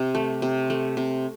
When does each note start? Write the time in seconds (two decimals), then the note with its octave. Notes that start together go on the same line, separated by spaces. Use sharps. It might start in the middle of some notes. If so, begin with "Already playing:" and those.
Already playing: C3
0.15 A3
0.42 C3
0.70 A3
0.97 C3